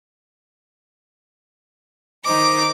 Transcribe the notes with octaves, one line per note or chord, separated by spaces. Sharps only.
D#3 D#4 C5 D6